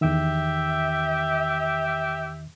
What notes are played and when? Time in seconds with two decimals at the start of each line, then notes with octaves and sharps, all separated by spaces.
0.01 E2 D#3 G4 E5